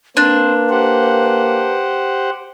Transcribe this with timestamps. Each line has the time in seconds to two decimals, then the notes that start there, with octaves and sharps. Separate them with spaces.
0.17 A#3 C4 D4 B4 C5
0.69 G4 C5 F#5